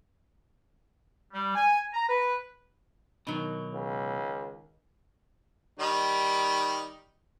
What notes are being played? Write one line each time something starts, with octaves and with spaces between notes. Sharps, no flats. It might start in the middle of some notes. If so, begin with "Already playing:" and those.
G3
G#5
A#5
B4
B2 D#3 F#3 D#4
C#2
D#3 G3 D#4